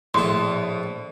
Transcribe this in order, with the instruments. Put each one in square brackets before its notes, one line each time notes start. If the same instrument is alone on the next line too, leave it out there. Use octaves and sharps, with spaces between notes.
[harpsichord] A#1 A4 [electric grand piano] A2 [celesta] C5 D5 [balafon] C6